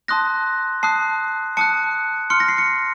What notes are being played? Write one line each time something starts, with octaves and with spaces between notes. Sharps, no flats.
A5 C6 D#6 F#6 A#6
A5 D#6 F#6 C7
A5 D#6 F#6 C#7
C6 F6 C#7
A#6
C7
C#7